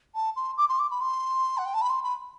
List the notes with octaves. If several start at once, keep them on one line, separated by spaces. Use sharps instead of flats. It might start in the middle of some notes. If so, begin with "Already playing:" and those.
A5
C6
D6
C6
D6
B5
C6
F#5
G5
A5
B5
C6
B5